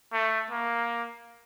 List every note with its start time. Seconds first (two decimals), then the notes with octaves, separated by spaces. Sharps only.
0.12 A3
0.51 A#3